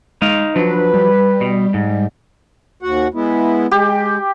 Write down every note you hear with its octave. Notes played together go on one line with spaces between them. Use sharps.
G#3 D#4 F5
F3 F#3 D4 B4
G3
B2
G#2
D#2 F#4 F#5
G#3 B3 E4
G#3 G4